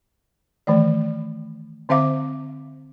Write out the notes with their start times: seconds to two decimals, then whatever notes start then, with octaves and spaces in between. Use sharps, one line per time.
0.67 D#3 E3 A3 D5
1.89 D3 C4 C5 E5 F5 D6